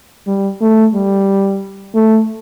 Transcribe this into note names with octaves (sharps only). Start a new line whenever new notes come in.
G3
A3
G3
A3